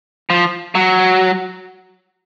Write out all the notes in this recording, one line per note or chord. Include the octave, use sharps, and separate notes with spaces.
F3
F#3